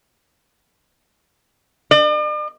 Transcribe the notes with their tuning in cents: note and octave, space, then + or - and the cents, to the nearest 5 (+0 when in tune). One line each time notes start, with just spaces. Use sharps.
D5 +45